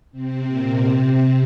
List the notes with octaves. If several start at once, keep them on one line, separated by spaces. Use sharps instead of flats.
C3 C4
A#2 A#3
C3 C4